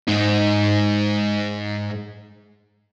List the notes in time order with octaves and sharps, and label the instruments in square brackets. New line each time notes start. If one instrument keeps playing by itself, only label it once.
[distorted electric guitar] G#2 D#4